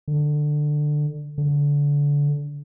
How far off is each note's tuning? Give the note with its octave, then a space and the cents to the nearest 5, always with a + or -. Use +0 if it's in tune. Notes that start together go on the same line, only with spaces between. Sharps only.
D3 +15
D3 -25